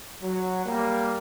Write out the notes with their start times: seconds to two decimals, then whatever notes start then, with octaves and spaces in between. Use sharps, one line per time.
0.22 F#3
0.65 G3 A#3